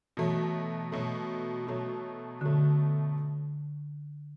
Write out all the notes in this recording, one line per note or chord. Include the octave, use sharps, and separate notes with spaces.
B2 E3 F#3 A3
B2 F#3 A3
B2 F#3 A3
B2 D3 F#3 A3